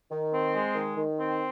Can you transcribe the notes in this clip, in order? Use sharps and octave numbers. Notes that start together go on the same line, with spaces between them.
D#3
C4
G#3
D#3
D#3
C4